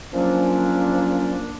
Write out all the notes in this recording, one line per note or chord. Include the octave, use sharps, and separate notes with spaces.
F3 F#3 A#3 C#4 D4